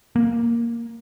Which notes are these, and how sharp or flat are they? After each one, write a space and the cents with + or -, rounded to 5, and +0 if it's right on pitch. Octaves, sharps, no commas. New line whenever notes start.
A#3 +0